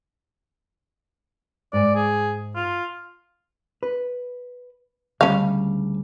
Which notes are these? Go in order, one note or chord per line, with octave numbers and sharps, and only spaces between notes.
G#2 D5 G#5
G#4
F4
B4
D2 C#3 G3 C#4 F5